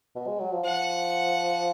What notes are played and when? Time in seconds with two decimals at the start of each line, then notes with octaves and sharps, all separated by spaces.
0.16 B2
0.27 G#3
0.40 F#3
0.52 F3
0.64 F3 F#5